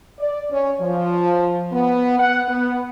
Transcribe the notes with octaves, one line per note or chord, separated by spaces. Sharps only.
D5
C#4
F3
B3
F#5
B3